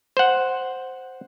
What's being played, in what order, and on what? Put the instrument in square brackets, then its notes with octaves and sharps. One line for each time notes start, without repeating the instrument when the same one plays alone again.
[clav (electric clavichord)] C5 F#5